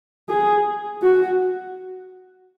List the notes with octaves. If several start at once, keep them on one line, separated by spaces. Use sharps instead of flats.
G#4
F#4